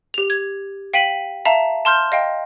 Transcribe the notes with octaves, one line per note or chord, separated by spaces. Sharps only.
G4 F7
G#6
F5 G5 B6 D#7 F#7
E5 F5 A5 A#5
A5 C6 F6 G6
D#5 F5 G5